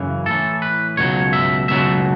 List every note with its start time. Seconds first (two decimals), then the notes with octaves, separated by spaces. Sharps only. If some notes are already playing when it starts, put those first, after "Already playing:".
Already playing: F#2 C#3 E3
0.26 A2 E3 A4
0.62 B4
0.97 C#2 B2 F#3 C#5
1.33 E5
1.68 C#2 B2 F#3 E5